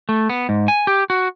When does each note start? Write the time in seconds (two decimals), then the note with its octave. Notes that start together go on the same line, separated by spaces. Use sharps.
0.09 A3
0.30 B3
0.49 G#2
0.68 G#5
0.87 G4
1.10 F#4